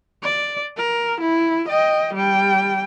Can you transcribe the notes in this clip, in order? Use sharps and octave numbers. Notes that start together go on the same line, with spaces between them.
D5
A#4
E4
D#5 G5
G3 G5